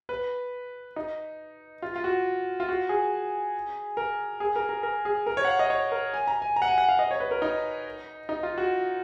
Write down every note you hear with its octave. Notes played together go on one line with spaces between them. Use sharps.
B4
D#4
F4
F4
F#4
F4
F#4
G#4
A#4
G#4
A#4
A#4
A#4
G#4
A#4
C#5
F#5
F5
D#5
C#5
A#4
G#5
A#5
G#5
A#5
F#5
G#5
F#5
F5
D#5
C#5
B4
A#4
D#4
D#4
F4
F#4